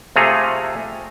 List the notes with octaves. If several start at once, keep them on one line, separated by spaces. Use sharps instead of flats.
C3 A3 F4 G#4 A#5